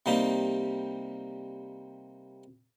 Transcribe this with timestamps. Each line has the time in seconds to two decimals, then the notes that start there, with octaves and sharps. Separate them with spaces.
0.06 C3 G3 A#3 D#4 G4